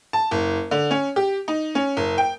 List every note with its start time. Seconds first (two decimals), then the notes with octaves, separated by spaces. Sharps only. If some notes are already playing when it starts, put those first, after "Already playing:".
0.13 A5
0.31 F#1
0.71 D3
0.91 C#4
1.16 G4
1.48 D#4
1.75 C#4
1.97 F#1
2.18 G5